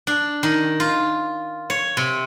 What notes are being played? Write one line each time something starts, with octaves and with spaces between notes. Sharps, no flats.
D4
D#3
F4
C#5
C3